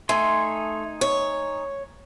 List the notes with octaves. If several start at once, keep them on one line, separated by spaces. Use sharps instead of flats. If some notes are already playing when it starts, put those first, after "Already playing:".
A3 D#4 G#5 C6
C#5